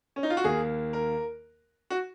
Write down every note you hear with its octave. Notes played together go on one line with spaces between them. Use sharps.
C#4
D#4
F4
F#4
D#2 D#3 A#3 G#4
A#4
F#4